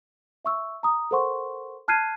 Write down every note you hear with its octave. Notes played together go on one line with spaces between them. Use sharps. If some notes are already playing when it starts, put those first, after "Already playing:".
E5 C#6 E6
A#5 D#6
A4 A#4 C5 F#5 C6 C#6
A5 F6 F#6 G#6 C7 D#7